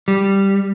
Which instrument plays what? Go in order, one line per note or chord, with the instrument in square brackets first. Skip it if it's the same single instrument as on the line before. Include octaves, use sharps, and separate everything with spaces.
[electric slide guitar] G3